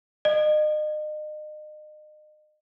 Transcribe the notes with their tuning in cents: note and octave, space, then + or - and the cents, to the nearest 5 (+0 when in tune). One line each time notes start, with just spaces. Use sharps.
D#5 -35